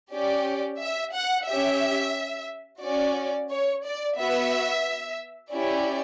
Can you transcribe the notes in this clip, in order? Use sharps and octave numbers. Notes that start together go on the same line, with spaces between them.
C#4 G4 D5
E5
F#5
C#4 G4 E5
C#4 F#4 D5
C#5
D5
B3 F#4 E5
C#4 E4 G4 D5